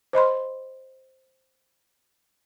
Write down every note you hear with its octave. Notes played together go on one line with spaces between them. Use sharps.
C5 D#5 B5 C6